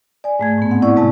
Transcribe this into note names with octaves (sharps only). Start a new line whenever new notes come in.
D5 G#5
G#2 A3 G#6
A2 B3
C4 F#5
E4 D5 F#5 C#6
C3 G#3 A5